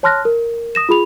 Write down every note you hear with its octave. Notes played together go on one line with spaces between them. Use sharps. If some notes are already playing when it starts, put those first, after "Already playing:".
C#5 A5 C6 F6 F#6 A#6
A#4
D#6 A#6 E7
F4 G#4 B5 F7